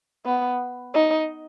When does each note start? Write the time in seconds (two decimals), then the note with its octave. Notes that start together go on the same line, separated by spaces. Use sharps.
0.26 B3
0.94 D#4